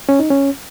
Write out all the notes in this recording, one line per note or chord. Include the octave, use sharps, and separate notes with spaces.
C#4
D#4
C#4